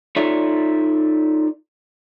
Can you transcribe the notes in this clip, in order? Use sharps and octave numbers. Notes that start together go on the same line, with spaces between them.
D#4 F4 A4 C#5 D5 E5